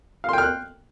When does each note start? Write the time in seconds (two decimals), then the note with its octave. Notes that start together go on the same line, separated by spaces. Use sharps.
0.24 F5
0.29 C6
0.33 G5
0.38 F6
0.43 F#6